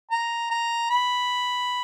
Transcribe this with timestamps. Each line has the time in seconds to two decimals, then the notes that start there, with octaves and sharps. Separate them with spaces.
0.11 A#5
0.50 A#5
0.90 B5